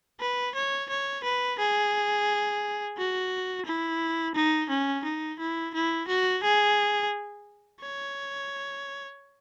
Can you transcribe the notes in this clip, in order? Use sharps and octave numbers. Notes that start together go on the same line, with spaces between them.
B4
C#5
C#5
B4
G#4
F#4
E4
D#4
C#4
D#4
E4
E4
F#4
G#4
C#5